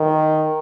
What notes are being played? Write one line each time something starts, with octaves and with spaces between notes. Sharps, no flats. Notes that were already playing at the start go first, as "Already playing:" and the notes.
Already playing: D#3